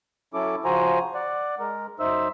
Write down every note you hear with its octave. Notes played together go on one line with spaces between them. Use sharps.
F#3 C#4 E4 A4 D6
C#3 F3 F#4 C5 G#5 A#5
D5 F#5
G#3 A#4
F#2 D#4 C5 E5 E6